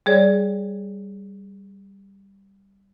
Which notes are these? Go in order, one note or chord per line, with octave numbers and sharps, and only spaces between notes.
G3 G#4 C#5 D5